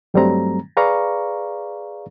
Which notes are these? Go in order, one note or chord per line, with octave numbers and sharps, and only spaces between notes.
G2 F#3 G3 A3 C4 A#5
G#4 B4 D5 F5 A#5 C#6